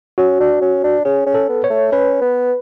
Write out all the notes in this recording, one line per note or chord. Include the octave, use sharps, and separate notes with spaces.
C#4 F#4
D4
C#4
D4
C#4 G#4
C#4
A4
B3
C#5
A3
C#4 B4
B3